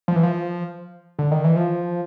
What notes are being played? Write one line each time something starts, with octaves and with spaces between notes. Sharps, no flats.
F3
E3
F3
D3
D#3
E3
F3